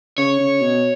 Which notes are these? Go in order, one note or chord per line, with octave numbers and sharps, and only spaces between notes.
C#3 C#5
C#3
B2